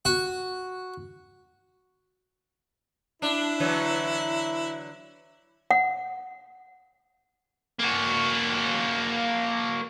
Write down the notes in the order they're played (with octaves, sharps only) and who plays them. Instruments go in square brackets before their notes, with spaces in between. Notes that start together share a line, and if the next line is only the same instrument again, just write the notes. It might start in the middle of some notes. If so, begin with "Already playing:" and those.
[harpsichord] F#4
[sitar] D4 [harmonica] E4
[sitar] D3 E3 F#3
[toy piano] F#5
[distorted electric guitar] A#3 F#4